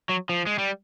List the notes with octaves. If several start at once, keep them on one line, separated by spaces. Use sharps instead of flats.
F#3
F3
G#3
G3